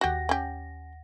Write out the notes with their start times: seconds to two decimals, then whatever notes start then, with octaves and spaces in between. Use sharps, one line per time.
0.01 D#2 F#4 G4 F#5 A#6
0.29 C#4 G4